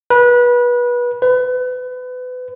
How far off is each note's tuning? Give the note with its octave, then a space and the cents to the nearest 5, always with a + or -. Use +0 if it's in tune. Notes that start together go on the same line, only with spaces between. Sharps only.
B4 -25
B4 +30